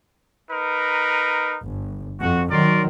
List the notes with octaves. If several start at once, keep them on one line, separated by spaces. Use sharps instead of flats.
D#4 A#4 B4
G1
F2 F#4
D#3 F#3 A#4 D5 C6